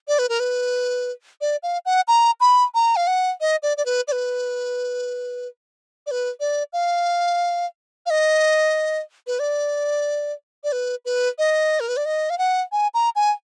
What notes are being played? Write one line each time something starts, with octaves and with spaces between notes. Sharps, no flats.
D5
B4
A#4
B4
D5
F5
F#5
A#5
B5
A#5
F5
F#5
D#5
D5
D5
B4
D5
B4
D5
B4
D5
F5
F5
D#5
B4
D5
D5
B4
B4
D#5
A#4
B4
D5
D#5
F5
F#5
G#5
A#5
G#5